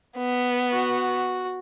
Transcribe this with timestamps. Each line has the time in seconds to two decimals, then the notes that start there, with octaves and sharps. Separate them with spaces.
0.17 B3
0.72 F#4